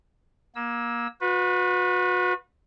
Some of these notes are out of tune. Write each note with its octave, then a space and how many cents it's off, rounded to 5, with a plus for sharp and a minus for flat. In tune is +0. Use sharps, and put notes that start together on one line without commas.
A#3 +25 E6 -15
F#4 -40 B4 +0